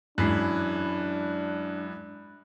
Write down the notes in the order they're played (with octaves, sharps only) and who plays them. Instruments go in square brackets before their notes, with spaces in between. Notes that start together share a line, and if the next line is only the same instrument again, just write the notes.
[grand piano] F#2 E3 C7 [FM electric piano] G#3 B5 F#6 [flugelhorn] D4